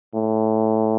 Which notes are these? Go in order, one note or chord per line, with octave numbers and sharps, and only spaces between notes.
A2